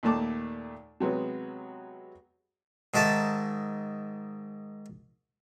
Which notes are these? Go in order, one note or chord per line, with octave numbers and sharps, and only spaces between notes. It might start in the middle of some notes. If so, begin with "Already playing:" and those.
D#2 A#2 A3 A5 D6
C3 F#3 G#3 B3
G#2 D#3 A4 E5 A5